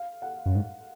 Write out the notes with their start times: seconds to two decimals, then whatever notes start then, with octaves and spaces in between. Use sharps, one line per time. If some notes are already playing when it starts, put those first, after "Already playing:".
Already playing: F5
0.22 F#5
0.46 F#2
0.56 G#2